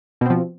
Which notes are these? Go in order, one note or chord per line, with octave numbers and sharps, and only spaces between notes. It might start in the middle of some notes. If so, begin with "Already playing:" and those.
B2 F3 C4